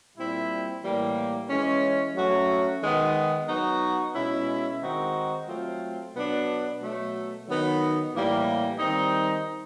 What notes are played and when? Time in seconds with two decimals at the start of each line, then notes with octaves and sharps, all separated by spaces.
0.16 A#2 G3 C4 E4
0.83 A2 E3 G3 A#3
1.49 E3 G#3 C#4
2.15 F#3 A3 C#4 F#4
2.82 D#3 G#3 B3
3.48 F#3 B3 D#4 F#4
4.15 B2 G#3 C#4 E4
4.82 D#3 G#3 C4 D#4 F#4
5.48 F#3 A3 C4 F4
6.15 B2 F#3 B3 D4
6.81 B2 F#3 A3
7.47 D#3 F#3 B3 D#4
8.13 A2 E3 G3 A#3
8.79 D#3 G3 C4 D#4